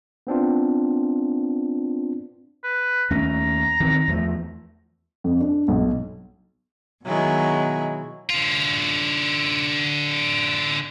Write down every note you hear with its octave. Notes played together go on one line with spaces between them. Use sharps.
B3 C4 D4 F4
B4
D#2 A3 C#4 A#5
D#3 E3 C4
E2 F3 A3
F2
D4
B1
B2 D#3 F#3 G#3 E4
D3 F4